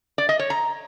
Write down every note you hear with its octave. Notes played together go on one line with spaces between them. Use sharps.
D5
D#5
C#5
A#5